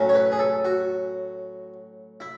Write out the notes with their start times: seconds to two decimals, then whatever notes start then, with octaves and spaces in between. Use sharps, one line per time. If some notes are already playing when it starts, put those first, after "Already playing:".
Already playing: A2 F#3 C#4
0.09 C#5
0.14 B4
0.32 G#4
0.39 A4
0.65 F#4
2.20 E4